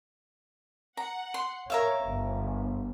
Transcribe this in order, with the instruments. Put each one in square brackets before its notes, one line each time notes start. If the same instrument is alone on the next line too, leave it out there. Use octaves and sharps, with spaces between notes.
[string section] F#5 [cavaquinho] A#5
[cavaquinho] C6
[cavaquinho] A#4 E5 F5 [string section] C#5
[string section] G1